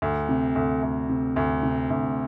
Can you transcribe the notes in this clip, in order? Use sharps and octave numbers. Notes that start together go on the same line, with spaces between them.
D2
C3
D2
D2
C3
D2
C3
D2